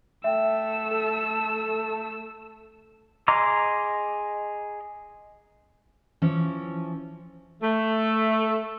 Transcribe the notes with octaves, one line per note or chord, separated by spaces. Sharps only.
A3 E5 G5 E6
A4
G#4 D#5 A#5 C6 D6
E3 F3 C#4
A3